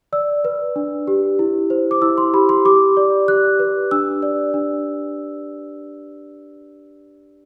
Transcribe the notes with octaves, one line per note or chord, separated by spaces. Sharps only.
D5 E6
B4
D4
G4
E4
C5
D6
E4 E6
C6
G4 B5
C6
G4 D6
D5
G4 F#6
B4
D4 E6
D5
D4